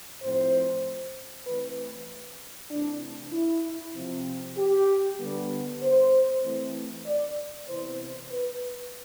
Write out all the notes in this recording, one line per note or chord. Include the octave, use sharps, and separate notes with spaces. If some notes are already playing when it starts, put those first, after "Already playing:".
A2 F3 C4 C5
E3 A3 C4 B4
C3 E3 A3 C4 D4
E4
C3 F3 C4
G4
D3 G3 B3
C5
E3 A3 C4
D5
C3 E3 B3 C5
B4